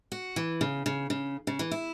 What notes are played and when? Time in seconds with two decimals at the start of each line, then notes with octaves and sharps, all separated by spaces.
0.12 F#4
0.36 E3
0.61 C#3
0.86 C#3
1.10 C#3
1.47 C#3
1.59 E3
1.71 E4